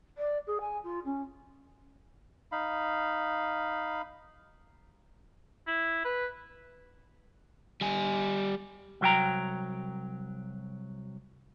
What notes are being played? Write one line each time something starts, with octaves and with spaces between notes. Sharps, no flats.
D5
G#4
G#5
F4
C#4
D#4 F5 B5
E4
B4
G3 G#5
C2 F#3 G5 A#5